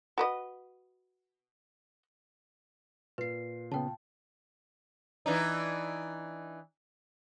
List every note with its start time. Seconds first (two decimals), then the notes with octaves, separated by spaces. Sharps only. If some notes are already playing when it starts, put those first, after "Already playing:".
0.18 F#4 B4 D#5
3.18 A#2 B4 C7
3.72 C#3 B3 G5 A5
5.26 E3 D4 D#4